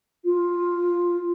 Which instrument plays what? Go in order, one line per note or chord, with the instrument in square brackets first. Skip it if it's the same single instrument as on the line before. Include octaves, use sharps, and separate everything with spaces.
[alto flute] F4